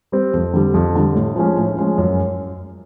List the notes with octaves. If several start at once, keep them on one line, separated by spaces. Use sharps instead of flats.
G3 C4
F2
D3 G3
F2
D3 G3
A2
F3 G#3 C#4
A2
F3 G#3 C#4
F#2